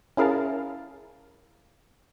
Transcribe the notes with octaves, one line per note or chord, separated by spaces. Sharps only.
C#4 E4 G#4 A#4 F5 A5